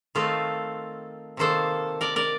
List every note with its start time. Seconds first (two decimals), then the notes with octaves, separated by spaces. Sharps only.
0.15 D#3 A3 C4 F4 A4
1.37 C3 D#3 A#3 A4 C5
2.01 A#4 D5
2.16 A#4 D5